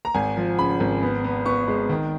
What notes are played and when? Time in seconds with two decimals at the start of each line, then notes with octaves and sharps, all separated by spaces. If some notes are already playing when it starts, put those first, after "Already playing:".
0.05 A#5
0.14 G#1 G#5
0.37 F3
0.58 C#3 B5
0.80 G#1
1.02 B3
1.24 B3
1.46 B3 C#6
1.68 G#3
1.89 D#3